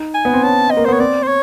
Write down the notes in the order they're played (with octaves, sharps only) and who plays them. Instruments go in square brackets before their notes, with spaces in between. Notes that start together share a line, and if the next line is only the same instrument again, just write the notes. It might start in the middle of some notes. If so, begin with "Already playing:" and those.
Already playing: [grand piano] D#4
[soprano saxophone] G#5
[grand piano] B3
C4
[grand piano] C#4 [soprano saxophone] A5
[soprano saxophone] D#5
[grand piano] A#3
[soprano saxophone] C5
[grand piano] B3 [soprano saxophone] C#5
[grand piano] C4 [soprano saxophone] D5
[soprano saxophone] C5
C#5